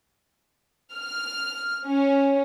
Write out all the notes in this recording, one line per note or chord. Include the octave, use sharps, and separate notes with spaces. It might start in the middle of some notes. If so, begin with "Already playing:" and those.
F6
C#4